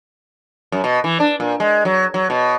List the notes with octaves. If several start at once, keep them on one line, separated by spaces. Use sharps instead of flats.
F#2
B2
E3
D4
A#2
G#3
F#3
F#3
B2